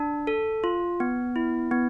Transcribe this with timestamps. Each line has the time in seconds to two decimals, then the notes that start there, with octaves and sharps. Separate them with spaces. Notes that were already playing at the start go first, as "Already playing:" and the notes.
Already playing: D4
0.27 A4
0.64 F4
1.00 B3
1.36 E4
1.71 B3